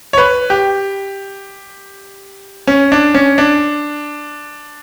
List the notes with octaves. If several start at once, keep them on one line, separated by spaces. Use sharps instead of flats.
C#5
B4
G4
C#4
D4
C#4
D4